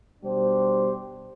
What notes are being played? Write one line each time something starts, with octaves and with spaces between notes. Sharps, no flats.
B2 G3 D4 G4 C5